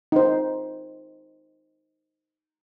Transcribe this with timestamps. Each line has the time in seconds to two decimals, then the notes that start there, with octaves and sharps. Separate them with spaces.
0.12 D#4 C5